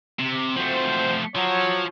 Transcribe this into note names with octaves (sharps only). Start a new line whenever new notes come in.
C3
F3 A3 C4 F#4 C5
F3 F#3 C#5